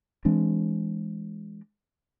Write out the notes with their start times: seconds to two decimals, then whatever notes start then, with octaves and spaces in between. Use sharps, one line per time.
0.25 E3 G#3 C4 D4